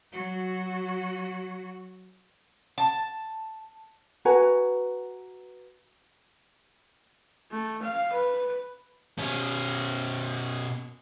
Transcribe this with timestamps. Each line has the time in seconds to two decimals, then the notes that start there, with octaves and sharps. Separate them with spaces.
0.12 F#3 F#4
2.78 A5
4.25 F#4 B4 G#5 A#5
7.52 A3
7.82 F5
8.13 B4
9.18 B2 C#4